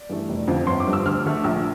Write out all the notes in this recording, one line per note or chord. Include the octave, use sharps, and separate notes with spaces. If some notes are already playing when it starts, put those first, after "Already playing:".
Already playing: D5
G2 E3 A3
F1
F2 D3 F3
G1 C6
D6
G2 F3
E6
D2 F6
D3 A3
A#1 E6